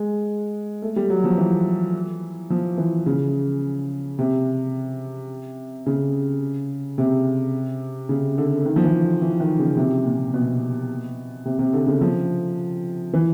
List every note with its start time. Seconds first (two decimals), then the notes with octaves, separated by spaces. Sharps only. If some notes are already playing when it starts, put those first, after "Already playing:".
Already playing: G#3
0.82 A3
0.96 G3
1.10 F#3
1.24 F3
1.38 E3
2.50 F3
2.78 E3
3.06 C#3
4.19 C3
5.86 C#3
6.98 C3
8.09 C#3
8.38 D3
8.66 D#3
8.76 F3
8.84 E3
9.22 E3
9.40 D#3
9.59 C#3
9.77 C3
10.05 A#2
10.34 B2
11.45 C3
11.59 C3
11.73 D3
11.86 C#3
12.01 F3
13.14 E3